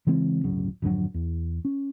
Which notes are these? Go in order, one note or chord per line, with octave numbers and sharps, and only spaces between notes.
C#3 E3 G#3 C4
D1 G1 C#3 F#3
G#1 F2 D3 F#3
E2
C#4